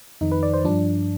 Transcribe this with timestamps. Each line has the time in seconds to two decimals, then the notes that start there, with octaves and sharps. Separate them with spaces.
0.21 F2 D#3 D#4
0.32 B4
0.43 D5
0.54 C5
0.64 G2 F3 D4